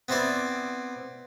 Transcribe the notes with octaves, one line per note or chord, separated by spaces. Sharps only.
B3 C4 E4 D5